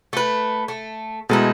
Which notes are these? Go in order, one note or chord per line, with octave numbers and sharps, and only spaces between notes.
A3 B4
A3
B2 G#3 A3 D#4 E4